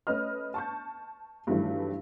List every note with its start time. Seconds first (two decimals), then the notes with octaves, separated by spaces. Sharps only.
0.07 A3 C#4 B4 D#5 F6
0.54 A5 C#6 G6
1.47 G2 D#3 E3 F#3 A3